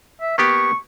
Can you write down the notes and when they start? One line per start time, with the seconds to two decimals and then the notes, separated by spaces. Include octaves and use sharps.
0.21 E5
0.38 A#3 B3 G4 C#6